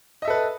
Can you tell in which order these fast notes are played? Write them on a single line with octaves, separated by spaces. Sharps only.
D#5 E5 A4 B4